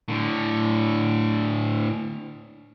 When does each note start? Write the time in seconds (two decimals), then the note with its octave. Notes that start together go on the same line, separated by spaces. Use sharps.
0.08 A2 D3